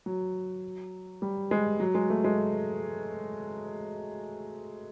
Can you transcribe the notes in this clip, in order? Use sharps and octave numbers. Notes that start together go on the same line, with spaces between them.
F#3
G3
G#3
F#3
G#3
A3
G#3